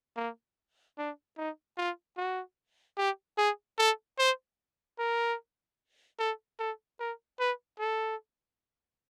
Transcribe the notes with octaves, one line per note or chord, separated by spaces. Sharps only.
A#3
D4
D#4
F4
F#4
G4
G#4
A4
C5
A#4
A4
A4
A#4
B4
A4